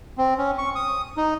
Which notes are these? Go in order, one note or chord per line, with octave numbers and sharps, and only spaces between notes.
C4
C#4
C#6
D#6
D#4